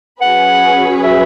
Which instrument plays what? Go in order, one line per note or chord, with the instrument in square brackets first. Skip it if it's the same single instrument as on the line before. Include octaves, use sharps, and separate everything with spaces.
[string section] F#3 C#4 G#4 B4 [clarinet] F#5
[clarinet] E5